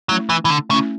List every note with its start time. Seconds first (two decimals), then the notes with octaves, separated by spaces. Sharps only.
0.09 F#3 A3 C#4 E4
0.29 E3
0.45 E3
0.50 D3
0.70 C#3 A3 C#4 E4